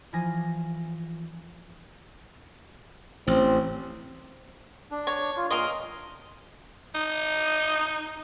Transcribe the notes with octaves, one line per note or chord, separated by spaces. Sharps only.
E3 F3 F4 G#5 A#6
A1 C4
D4
C#5
F4
A#2 A#4 D#5 C6
D#4